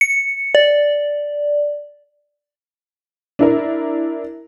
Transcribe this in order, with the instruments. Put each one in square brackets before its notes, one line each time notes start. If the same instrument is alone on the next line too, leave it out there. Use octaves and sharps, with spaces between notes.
[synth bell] C#7
D5
[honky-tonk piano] D4 E4 A#4